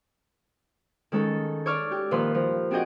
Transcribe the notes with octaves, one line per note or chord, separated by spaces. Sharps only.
D#3 G#3 C#4 A4
C#5 D5 C#6 D6 E6 F6
G4
A#2 D#3 F3 B4 C6
F3
C4 D4 F#4 G#4 D#5 G5